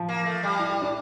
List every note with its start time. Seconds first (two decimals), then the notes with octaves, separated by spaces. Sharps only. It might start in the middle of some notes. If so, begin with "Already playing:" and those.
Already playing: F3
0.09 A#3
0.26 A3
0.43 G3
0.59 E4
0.71 E4
0.82 D4